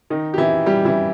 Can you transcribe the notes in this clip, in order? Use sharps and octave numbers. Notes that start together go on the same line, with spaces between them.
D#3 D#4
G4
E3 E4
G3 G4
E3 E4